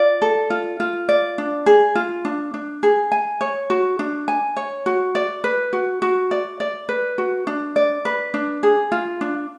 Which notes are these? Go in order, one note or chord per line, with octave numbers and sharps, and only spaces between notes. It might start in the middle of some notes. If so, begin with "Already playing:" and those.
Already playing: F4 D5
A4
F4
F4
D5
D4
G#4
F4
D4
D4
G#4
G#5
C#5
F#4
D4
G#5
C#5
F#4
D5
B4
F#4
F#4
D5
D5
B4
F#4
D4
D5
B4
D4
G#4
F4
D4